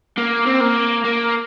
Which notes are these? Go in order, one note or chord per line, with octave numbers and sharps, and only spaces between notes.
A#3
C4
A#3
A#3